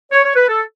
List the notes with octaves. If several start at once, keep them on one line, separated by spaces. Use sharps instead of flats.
C#5
C#5
B4
A4